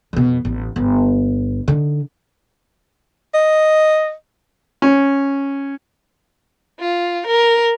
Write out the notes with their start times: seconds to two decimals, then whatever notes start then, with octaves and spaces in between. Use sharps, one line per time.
0.13 F2 B2
0.45 A1
0.76 G1
1.68 D3 D#4
3.34 D#5
4.82 C#4
6.80 F4
7.27 A#4